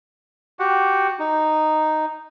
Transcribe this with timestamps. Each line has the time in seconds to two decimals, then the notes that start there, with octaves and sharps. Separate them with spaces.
0.59 F#4 G4 F#5
1.19 D#4